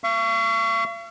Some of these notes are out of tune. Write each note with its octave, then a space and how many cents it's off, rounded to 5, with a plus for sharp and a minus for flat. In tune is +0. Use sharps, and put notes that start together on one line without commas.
F5 -45 C#6 +20